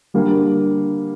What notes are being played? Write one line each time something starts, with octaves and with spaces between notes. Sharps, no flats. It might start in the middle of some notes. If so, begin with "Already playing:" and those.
D3 G3 A#3